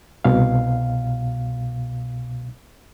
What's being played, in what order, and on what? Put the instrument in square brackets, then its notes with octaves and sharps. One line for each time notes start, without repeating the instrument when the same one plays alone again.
[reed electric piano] C2 B2 F5